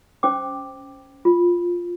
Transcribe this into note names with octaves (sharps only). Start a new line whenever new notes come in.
C#4 C5 G5 D6
F4